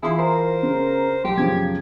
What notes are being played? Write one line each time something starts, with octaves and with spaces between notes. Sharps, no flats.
E3 E4 F4 G#4 C6
A#4 C5
C#3
B1 G4
F#2 C#3 F3 G#6